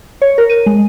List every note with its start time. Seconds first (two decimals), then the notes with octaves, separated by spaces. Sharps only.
0.22 C#5
0.38 A#4
0.50 D#7
0.66 G#3